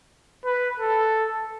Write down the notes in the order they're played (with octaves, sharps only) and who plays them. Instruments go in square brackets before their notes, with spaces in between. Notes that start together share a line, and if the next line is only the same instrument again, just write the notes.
[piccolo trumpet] B4
A4